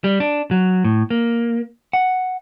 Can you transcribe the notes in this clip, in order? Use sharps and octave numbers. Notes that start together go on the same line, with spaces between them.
G3
D4
F#3
A2
A#3
F#5